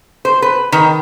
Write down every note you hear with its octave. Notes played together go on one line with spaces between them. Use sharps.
C5
B4
D#3